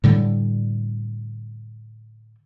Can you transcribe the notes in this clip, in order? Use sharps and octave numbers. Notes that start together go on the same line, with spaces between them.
A2 D3 G3